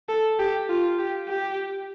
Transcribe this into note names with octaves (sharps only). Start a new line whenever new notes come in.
A4
G4
F4
G4
G4